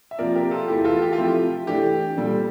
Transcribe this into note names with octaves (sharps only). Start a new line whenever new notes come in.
E5
C3 F3 A#3 F4 A#4 D5
G4 A#4
F4 A4
E2 E3 A3 E4 G4
F4 A4
G4
F4
C3 F3 A3 E4 G4
E3 A3 D4 G4
A#2 G3 D4 A4